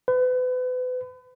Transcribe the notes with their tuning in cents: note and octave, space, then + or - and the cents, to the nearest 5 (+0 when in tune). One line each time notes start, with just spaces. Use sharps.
B4 +35